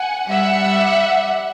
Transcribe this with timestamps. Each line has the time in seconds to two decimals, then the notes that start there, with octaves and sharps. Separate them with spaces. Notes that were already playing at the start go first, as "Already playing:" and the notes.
Already playing: F#5 G#5
0.28 G3 E5 F#5